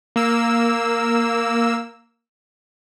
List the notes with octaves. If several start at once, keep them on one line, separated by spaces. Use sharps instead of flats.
A#3 E6